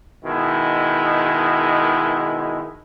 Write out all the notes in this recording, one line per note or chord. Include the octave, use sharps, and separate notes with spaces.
B2 D#3 G#3 E4